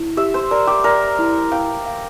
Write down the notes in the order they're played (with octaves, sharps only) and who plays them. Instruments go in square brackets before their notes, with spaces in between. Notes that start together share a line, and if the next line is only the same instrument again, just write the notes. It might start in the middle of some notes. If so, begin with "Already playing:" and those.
Already playing: [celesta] E4
[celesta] G4 [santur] E5
[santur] C5
[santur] A#4 [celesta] D5
[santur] G4
[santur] A#4 [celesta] D5
[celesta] E4
[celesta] F5 [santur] G5
[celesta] F5